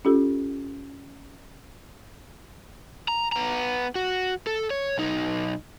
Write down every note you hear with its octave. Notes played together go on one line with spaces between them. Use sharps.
C#4 F4 G4 A4
A#5
B3 A#5
F#4
A4
C#5
B1 D#4